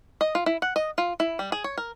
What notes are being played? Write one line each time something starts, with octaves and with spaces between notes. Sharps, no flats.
D#5
F4
E4
F#5
D#5
F4
E4
G3
G#4
C#5
A#4